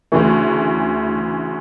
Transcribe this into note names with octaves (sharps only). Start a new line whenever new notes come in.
D2 C#3 E3 A3